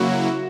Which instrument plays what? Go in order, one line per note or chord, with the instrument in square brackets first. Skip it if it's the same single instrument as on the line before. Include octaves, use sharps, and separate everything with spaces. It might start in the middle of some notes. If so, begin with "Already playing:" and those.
Already playing: [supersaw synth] C#3 F#3 A#3 E4 [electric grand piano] F#4